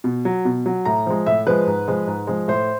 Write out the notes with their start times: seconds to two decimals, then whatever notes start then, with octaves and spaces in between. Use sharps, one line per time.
0.04 B2
0.25 F#3
0.45 B2
0.66 F#3
0.85 A2 A#5
1.06 F3 G#3
1.26 A2 E5
1.47 F3 G#3 B4
1.67 G#2
1.88 F3 G#3
2.07 G#2
2.27 F3 G#3
2.48 A2 C5